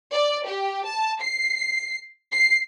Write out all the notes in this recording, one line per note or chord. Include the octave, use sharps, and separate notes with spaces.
D5
G4
A5
C7
C7